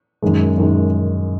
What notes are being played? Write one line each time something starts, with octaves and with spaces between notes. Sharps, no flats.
F#2 D#3 G#3
F#2 D#3 G#3